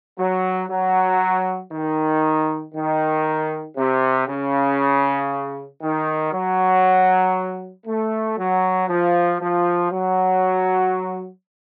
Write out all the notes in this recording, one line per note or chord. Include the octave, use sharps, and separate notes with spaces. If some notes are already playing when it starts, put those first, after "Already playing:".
F#3
F#3
D#3
D#3
C3
C#3
D#3
F#3
A3
F#3
F3
F3
F#3